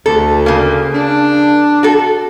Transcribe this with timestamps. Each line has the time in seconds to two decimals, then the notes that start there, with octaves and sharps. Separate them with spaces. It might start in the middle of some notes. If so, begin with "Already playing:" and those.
0.06 D2 A4
0.46 C#3 A#3
0.93 D4
1.83 F#4 A4